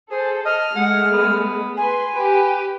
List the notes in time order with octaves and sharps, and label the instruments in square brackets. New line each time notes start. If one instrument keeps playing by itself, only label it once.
[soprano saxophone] G#4 [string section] A4 [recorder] C5
[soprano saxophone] D#5 [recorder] F6
[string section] G#3 A3 [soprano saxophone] F#5
[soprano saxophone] B3
[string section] B4 C6 [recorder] G#5
[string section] G4 [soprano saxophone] B4